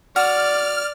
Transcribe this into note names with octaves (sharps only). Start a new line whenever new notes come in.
F#4 D5 F6